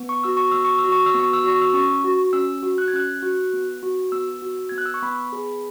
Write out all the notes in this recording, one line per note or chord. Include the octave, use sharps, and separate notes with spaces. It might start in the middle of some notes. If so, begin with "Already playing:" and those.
Already playing: B3
C#6
F#4 E6
C#6
B3 E6
C#6
E6
F#4
C#6
E6
B3
C#6
E6
F#4 C#6
E6
C#4 C#6
F#4
C#4 E6
F#4
F#6
G#6
C#4 F#6
F#4
B3
F#4
B3 E6
F#4
B3 G#6
F#6
E6
C#6
B3 B5
G#4